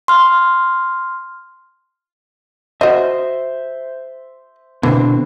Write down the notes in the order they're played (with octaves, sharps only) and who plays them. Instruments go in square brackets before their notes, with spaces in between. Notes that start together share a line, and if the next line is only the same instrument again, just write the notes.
[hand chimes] C6 F6
[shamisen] F#4 D#5 [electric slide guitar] C5 E5
[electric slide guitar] B2 D3 C4 [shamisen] E3